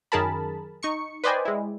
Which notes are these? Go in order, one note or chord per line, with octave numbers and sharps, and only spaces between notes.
F#2 D#3 G#4 A#4 A5 B5
D#4 C#6 C#7
B4 C5 D5 D#5 G5 G#5
G#3 E4